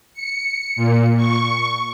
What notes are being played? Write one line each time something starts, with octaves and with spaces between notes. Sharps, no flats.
C#7
A#2
C#6